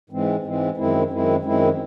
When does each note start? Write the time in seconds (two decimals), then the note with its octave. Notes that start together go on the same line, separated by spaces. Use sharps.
0.10 G#2 E3 G#3 C4
0.43 G#2 E3 G#3 C4
0.77 F#2 D#3 G#3 C4 E4
1.10 F#2 D#3 G#3 C4 E4
1.42 F#2 D#3 G#3 C4 E4